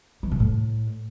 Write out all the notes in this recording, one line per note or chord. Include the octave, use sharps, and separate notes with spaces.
E3
B2
A2